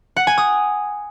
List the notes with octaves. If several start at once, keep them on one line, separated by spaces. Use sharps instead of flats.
F#5
G#5
D#6